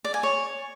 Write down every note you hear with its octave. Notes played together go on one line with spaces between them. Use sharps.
D5
G#5
C#5